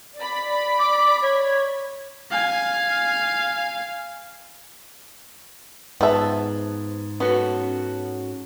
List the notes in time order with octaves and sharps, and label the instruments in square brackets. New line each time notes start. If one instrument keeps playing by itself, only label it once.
[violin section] D5 B5
[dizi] D6
C#5
[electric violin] F5 G#5
[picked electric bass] G#2 [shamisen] F3 E5 [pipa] B3 A5
[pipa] B3 [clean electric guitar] C#4 F#4 A4